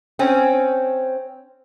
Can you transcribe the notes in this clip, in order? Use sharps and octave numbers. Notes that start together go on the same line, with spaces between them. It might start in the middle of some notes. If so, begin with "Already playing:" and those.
C4 C#4